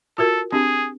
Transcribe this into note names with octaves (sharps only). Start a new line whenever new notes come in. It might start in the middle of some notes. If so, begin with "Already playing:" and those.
F4 F#4 A4 A#4
C4 D4 G4 G#4